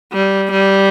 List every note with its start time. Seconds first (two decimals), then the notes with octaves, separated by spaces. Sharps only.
0.13 G3
0.52 G3